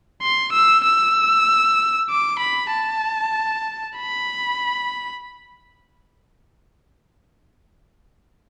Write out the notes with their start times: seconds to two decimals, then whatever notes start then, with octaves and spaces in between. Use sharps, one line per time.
0.22 C6
0.53 E6
0.84 E6
2.10 D6
2.40 B5
2.72 A5
3.97 B5